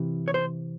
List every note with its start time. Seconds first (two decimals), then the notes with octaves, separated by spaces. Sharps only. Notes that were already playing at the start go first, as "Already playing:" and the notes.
Already playing: C3 E3
0.28 C#5
0.34 C5